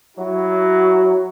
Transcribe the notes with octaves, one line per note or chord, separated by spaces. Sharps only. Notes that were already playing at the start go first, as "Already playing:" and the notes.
F#3 E4 F#4